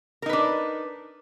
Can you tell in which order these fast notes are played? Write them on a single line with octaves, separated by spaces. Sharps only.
A#4 D#4 B4 D4